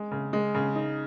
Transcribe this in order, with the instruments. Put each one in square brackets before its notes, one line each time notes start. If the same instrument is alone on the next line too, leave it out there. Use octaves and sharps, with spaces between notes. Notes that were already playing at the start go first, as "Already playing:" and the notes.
Already playing: [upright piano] G#3
C#3
G#3
C#3
D#4